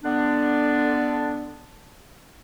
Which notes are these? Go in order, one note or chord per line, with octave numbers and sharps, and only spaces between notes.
D3 B3 D4